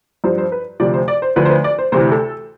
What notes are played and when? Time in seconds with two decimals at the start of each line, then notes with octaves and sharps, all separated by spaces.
0.24 G2 F3 C5
0.38 C5
0.52 B4
0.80 D2 C3 F3 D5
0.93 C5
1.08 D5
1.22 C5
1.36 D2 D3 F3 B4
1.45 C5
1.50 B4
1.64 D5
1.78 C5
1.92 D2 C3 E3 C5
2.12 A4